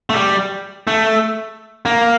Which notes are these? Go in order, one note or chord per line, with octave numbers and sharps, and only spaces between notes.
A3
G3
A3
A#3